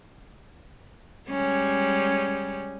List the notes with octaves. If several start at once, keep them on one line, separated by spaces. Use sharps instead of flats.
G3 G#3 C#4